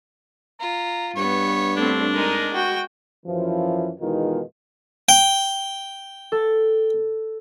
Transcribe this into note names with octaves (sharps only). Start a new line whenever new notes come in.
F4 A#5
G2 B3 C#5 C#6
A3 C4 D4
G#3 D#4 A#4
F#4 G5
F#2 E3 F3
E2 B2 D#3 G#3 D#4 F4
G5
A4